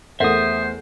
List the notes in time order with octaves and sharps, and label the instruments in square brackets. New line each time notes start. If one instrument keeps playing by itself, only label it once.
[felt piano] E2 A3 [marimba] A4 A#4 F#5 [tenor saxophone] C5 [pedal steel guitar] E5 D#6